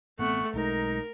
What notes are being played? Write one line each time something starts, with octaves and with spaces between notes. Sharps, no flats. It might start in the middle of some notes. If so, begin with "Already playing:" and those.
A1 A3 B3 C4 F#5 C#6
B1 G#3 D#4 A#4